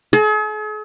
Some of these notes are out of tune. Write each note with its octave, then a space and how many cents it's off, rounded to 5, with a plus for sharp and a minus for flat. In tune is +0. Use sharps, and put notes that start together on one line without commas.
G#4 +45